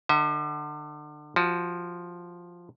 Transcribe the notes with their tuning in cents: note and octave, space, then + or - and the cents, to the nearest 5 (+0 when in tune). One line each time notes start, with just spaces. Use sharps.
D3 +30 E5 -40
F3 +0 F#4 +20